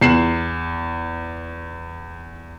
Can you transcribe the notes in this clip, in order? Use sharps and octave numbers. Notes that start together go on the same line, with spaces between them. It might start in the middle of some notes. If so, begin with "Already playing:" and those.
E2 C7 E7 F#7